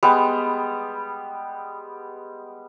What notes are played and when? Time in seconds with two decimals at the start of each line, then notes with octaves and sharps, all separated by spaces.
0.03 G3 G#3 B3